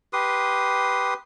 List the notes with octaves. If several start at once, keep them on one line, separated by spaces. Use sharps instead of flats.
G4 B4 C6 D#6